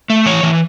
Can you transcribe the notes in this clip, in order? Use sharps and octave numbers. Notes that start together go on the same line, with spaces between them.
A3
E3 C#5
E3